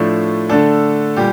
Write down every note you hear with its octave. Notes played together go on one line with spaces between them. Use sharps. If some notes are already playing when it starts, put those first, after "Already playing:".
Already playing: A2 F3 A3 D4
D3 A3 D4 A4
A#2 G3 G4